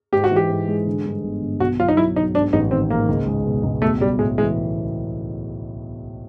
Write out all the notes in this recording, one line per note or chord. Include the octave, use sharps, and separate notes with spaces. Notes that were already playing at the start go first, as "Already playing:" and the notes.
G#2 G4
F#4
E3
G4
G#2
G#3
D3
G2
G1
G1
B1 F#4
F#3 F4
D#4
F#3 E4
B1 D#4
G#2 D4
A1 D#4
D#3 C4
G#2 A#3
C#2
G#3
B2
C#2
B1 A3
B1 G3
A2 G#3
E3 G#3